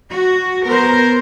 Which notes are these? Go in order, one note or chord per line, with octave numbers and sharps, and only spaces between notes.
F#4
B3 A#4 C5